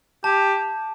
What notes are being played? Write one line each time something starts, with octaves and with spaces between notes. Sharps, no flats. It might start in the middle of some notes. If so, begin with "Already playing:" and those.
G4 A5